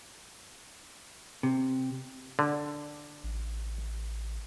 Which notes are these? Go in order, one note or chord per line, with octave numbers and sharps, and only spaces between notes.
C3
D3
A1